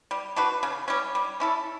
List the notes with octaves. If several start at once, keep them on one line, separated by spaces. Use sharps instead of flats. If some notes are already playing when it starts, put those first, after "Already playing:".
G3
D4 F#4 B4
C#3
G3 C#4
G3
C#4 E4 A4